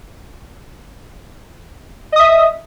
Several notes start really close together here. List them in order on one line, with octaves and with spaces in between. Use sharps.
D#5 D#6 E5